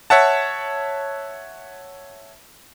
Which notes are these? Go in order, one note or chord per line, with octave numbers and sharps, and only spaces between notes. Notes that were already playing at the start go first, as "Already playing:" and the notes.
C#5 E5 F#5 A5